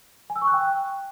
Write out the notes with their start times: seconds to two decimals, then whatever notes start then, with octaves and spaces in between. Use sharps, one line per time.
0.30 G#5
0.36 E6
0.42 C#6
0.47 F#6
0.53 G5